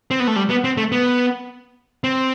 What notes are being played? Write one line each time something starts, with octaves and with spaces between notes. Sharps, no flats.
C4
B3
A3
G3
B3
C4
A3
B3
C4